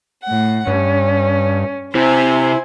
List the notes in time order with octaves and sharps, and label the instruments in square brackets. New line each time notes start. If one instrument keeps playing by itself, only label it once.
[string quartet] A2 F#5
[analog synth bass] G2 [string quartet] C#4
[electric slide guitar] C3 C4 [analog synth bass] E4 [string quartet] C5 G#5